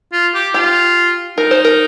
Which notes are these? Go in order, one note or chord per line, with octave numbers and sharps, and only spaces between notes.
F4
G4
F4 G4
D#4 A#4
C5
A#4